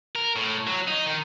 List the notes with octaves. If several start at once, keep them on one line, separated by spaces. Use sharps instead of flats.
A#4
A2
F#3
D#4
D#3